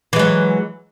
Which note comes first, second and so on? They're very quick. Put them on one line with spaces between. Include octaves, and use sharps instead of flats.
E3 G#3 F#3